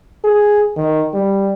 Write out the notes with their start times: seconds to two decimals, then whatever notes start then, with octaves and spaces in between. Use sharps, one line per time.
0.24 G#4
0.76 D#3
1.14 G3